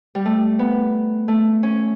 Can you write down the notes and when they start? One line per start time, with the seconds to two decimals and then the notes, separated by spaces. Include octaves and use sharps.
0.15 G3
0.26 A3
0.59 B3
1.28 A3
1.63 C#4